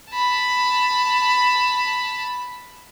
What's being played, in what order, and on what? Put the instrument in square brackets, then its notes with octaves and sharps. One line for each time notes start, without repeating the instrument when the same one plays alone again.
[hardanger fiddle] A5 B5